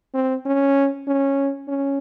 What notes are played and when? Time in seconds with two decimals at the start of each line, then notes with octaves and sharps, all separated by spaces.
0.14 C4
0.45 C#4
1.07 C#4
1.68 C#4